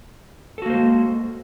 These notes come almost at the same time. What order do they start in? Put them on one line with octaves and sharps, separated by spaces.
A4 F#4 A#3 C5 G#3